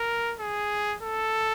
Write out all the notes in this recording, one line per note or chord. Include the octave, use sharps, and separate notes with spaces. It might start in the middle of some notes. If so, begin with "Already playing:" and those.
Already playing: A#4
G#4
A4